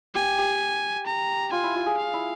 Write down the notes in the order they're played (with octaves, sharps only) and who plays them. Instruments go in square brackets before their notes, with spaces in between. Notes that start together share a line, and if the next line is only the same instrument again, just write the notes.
[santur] G4 [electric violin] G#5
[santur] G4
[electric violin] A#5
[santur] F4 [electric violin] G#5
[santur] E4
F4
G#4
[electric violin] F5
[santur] E4